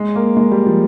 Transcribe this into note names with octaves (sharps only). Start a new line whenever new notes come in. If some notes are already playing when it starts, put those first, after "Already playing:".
Already playing: G#3
A#3
G#3
G3
F3